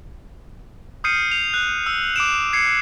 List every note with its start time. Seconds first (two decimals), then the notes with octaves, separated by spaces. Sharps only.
1.04 D#6 F6 G6 C7 C#7 D#7
1.31 F7
1.54 F#6
1.86 E6
2.16 D6 D7 E7
2.53 G#6 C7 C#7